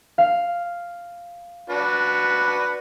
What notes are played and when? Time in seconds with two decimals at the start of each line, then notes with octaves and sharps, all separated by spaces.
0.18 F5
1.70 D4 F#4 B4